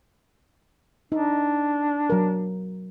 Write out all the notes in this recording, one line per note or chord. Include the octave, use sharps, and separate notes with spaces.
D4 D#4
F#3 A#4